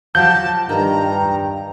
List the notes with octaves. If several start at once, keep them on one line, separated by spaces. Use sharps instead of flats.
F3 F#3 G4 A5 G6
G2 D#3 A#5